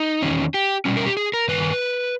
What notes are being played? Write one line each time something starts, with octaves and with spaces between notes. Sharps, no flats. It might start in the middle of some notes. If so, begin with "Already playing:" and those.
Already playing: D#4
E2 D#3 C#4
G4
B2 G3 C#4
A#4
G4
G#4
A#4
G2 D#3 B4